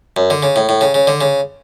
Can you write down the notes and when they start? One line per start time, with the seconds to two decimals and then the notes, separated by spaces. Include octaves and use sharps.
0.17 F#2
0.30 D3
0.43 C#3
0.56 A2
0.69 A2
0.81 C#3
0.94 C#3
1.07 D3
1.21 C#3